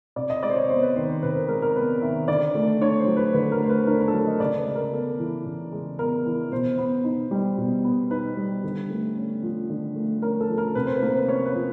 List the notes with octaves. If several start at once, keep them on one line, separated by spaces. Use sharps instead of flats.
C3 D5
D#5
G#3 D5
C5
C#5
B3 C5
B4
D#3 C5
C5
C3 B4
A#4
G#3 A#4
A#4
B3 B4
D#3 E5
D3 D5
A3
D4 C#5
C5
F#3
B4
D3 B4
A#4
A3 C5
B4
D4 A#4
A#4
A4
F#3 A#4
D#5
C#3 D5
B4
G#3
A#4
B3 A4
E3
C#3
G#3
B3 A#4
E3
B2 C5
B3
D#4
G3
B2
B3
D#4 B4
G3
D3
A3
C#4
F3
D3
A3
C#4 A#4
A4
F3
A#4
C3 B4
C5
B4
A#3 C5
B4
C#4 C#5
B4
F3